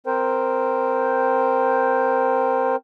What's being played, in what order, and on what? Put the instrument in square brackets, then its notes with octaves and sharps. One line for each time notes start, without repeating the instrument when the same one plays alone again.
[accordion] C4 A#4 C5 G5